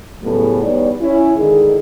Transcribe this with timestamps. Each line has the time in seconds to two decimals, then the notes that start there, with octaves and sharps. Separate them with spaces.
0.21 F#2 A2 C#3 G3 A3 B3
0.62 E2 G3 B3 D#4 C#5 D5
1.00 C#4 E4
1.34 G#2 D3 D#3 E4 G#4